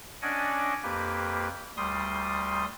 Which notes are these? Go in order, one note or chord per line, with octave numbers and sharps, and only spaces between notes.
C#4 D4 D5 D#5 F#5 G#5
F2 A#3 G4 B4
D2 G3 C6 D#6